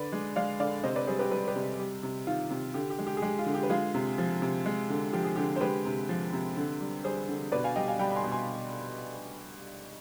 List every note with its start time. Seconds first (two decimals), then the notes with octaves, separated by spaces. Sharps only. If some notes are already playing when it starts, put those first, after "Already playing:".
Already playing: D3 B4 D5
0.12 G#3
0.36 G#3 D5 F5
0.60 D3 D5 F5
0.83 C3 C5 D#5
0.96 B4 D5
1.07 G3 G#4 C5
1.19 G4 B4
1.32 G3 G4 B4
1.48 G4 B4
1.56 C3
1.79 G3
2.03 C3
2.27 D#3 F4
2.51 C3
2.74 D3 G4
2.90 G4
2.99 G#3
3.07 G4
3.17 G#4
3.22 G#3 G4
3.39 F4
3.46 D3
3.54 G4
3.63 B4
3.70 G#3 F4 G#4
3.94 C3
4.18 F3
4.42 C3
4.66 G#3
4.90 D3
5.13 F3 G4
5.24 G#4
5.36 D3 G4
5.56 C5
5.61 G#3 G4 B4
5.85 C3
6.09 F3
6.33 C3
6.57 D3
6.81 G3
7.04 G3 G#4 C5
7.28 D3
7.52 B2 B4 D5
7.64 F5 G#5
7.76 G3 D#5 G5
7.88 F5 G#5
7.99 G3 G5 B5
8.10 B5
8.16 G#5 C6
8.24 B2
8.32 G#5 C6